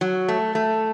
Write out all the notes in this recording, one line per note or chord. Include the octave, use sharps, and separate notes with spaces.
F#3
A3
A3